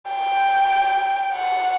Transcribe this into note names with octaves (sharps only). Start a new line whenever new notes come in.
G5
F#5